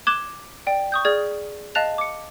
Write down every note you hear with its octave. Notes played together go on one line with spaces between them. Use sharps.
D6 F#6 G#6 E7 F#7 G7
D5 G5
C#6 D#6 G6
G#4 D5 F6 G#6
D#5 F5 A5 F#6 A6 F7
D6 C#7